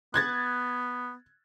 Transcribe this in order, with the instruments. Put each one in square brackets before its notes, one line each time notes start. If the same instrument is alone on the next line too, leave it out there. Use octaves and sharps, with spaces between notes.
[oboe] B3 [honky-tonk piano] F#6 G#6 A6